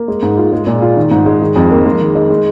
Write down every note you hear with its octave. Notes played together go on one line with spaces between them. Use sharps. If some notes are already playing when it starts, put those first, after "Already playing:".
Already playing: A#3
G#3
G#2
F4
G#3
A#2
F4
D#3
G#2
G#3
D#3
F2
A#3
G#3
D#3
D#4
G#3